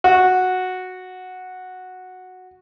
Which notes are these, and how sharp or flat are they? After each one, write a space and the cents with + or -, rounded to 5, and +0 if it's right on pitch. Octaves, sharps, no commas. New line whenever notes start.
F#4 -5